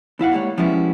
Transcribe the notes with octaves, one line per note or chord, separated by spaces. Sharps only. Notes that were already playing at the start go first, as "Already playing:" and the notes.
D#2 E4 F5 F#5
G3 G#3 A#3 C#5
F3 G3 G#3 B3 C#4 E4